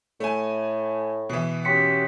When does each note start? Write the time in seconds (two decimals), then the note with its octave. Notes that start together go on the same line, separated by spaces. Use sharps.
0.20 A2 A3 G#5
1.29 B2 E3
1.65 C#4 F#4 G4 C6 B6 C#7